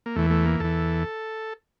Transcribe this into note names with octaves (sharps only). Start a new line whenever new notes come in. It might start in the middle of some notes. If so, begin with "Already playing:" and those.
A#3
E2 E3 A3
A3
A#3
E2 E3 A4